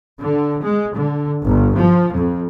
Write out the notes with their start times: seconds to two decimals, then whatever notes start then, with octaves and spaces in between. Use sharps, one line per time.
0.22 D3
0.64 G#3
0.98 D3
1.45 G1
1.78 F3
2.17 F2